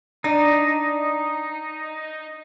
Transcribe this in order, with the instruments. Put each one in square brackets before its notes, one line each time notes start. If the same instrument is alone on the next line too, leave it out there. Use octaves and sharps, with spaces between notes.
[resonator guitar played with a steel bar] D4 [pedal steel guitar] D#4